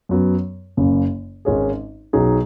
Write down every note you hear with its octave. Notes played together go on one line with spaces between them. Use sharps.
F#2 F#3 B3
F#1 F#2 C#3
G#1 G#2 G#3 C#4 G#4
B1 B2 F#3 D#4 G#4